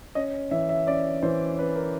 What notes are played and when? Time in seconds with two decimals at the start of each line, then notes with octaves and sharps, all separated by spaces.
0.15 C#4 D#5
0.51 E3 E5
0.69 E5
0.87 C#4 D5
1.23 E3 C5
1.58 C#4 B4
1.76 A#4